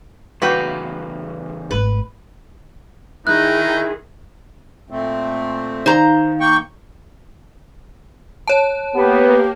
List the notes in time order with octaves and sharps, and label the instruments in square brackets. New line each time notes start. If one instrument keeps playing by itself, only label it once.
[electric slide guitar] E2 A#2 C#3 [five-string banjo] A#3 F#4 G5 [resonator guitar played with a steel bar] B4
[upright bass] G#1 A3 [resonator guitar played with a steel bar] B4
[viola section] D#3 G#4 [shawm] D#4 [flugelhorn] E4 [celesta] F#6
[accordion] A#2 A3 C4
[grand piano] D#3 [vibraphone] D#4 F5 [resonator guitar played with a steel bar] C5 A#5
[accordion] A#3 G5 C#6
[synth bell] C#5 A5
[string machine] A#3 [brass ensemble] B3 [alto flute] G4